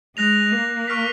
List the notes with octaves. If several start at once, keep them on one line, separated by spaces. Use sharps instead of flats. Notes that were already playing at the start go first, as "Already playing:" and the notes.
G#3 F#6 A#6 F7
A#3
C#6 F6 B6